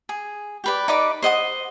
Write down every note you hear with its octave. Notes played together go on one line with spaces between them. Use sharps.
G#4
G4 B4 D5
D#4 B4 D5 D6
C5 D#5 F#5 D#6